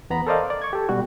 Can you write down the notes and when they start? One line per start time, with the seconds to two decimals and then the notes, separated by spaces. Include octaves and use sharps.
0.10 E2 B3 A#5 B5
0.27 A4 A#4 C5 D5 D#5 F5
0.50 D5
0.62 C#6 G#6
0.73 G4 A4
0.89 B2 G3 F#4